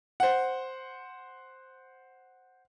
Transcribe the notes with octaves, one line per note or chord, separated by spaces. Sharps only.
C5 F#5